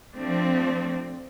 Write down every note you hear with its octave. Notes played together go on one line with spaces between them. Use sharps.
F3 A3 C4 D4